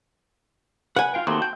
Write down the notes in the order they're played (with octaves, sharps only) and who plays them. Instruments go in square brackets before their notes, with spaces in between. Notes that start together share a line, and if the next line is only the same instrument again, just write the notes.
[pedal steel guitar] B4 [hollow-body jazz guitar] F#5 G#5
[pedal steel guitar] F4 F5 G5
[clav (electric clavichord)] D#2 A3 C4 [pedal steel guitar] F#4 A5 C6
[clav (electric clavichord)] G5